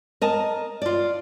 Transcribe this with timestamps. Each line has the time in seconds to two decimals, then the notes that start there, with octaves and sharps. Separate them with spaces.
0.21 A#4 D#5 A5
0.82 F4 D5